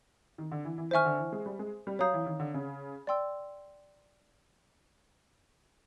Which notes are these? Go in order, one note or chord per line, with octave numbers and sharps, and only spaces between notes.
D#3
D3
E3
E3
D#3 C5 E5 G#5 C#6 F6
D3
E3
G#3
G3
G#3
G3
F#3 C#5 F5 A#5 D#6 G6
E3
D#3
D3
C#3
D5 G5 C6 E6